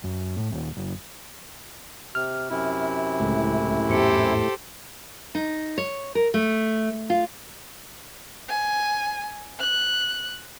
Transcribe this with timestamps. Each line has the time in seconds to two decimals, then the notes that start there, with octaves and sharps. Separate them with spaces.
0.04 F#2
0.36 A2
0.52 D#1
0.76 F#1
2.15 C3 F6
2.50 F#2 C3 E4
3.20 C#2 A2
3.88 E2 G#2 G4 A4 C5 C#7
5.35 D#4
5.78 C#5
6.15 A#4
6.34 A3
7.10 F4
8.49 G#5
9.59 F#6